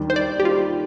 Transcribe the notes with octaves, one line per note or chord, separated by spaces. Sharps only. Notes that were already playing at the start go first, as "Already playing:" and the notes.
Already playing: D#2 D#3 G3 D4
C5
D5
G4
F4